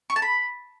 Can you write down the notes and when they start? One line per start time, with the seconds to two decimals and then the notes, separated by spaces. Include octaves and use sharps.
0.10 C#6
0.16 A5
0.22 B5